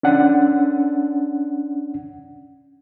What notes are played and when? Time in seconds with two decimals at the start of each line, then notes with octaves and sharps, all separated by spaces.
0.03 C#4 D4 F#5